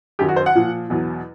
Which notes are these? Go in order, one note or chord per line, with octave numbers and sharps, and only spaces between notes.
F#2 D#3 F#3 G4
F#4
C5
F#5
A#2 F3
E2 B2 F#3